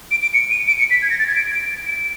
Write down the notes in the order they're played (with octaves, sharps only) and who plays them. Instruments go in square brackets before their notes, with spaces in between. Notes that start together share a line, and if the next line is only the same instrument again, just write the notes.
[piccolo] D7
D7
C#7
D#7
D7
C#7
B6
G#6
A#6
A6
G#6
D7
D7
D7